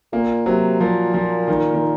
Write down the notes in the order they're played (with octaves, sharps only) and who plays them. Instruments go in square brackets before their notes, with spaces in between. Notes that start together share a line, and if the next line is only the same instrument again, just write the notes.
[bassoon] A#2 [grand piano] A#3
[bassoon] C3 [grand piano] F#3
[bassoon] A#2 [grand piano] F3
[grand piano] F3
D#3
D#3